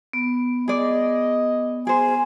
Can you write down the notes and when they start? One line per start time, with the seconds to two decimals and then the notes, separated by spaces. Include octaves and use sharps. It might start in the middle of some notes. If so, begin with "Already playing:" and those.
0.13 B3
0.68 G#4 D5 D#5
1.87 G#4 C5 G#5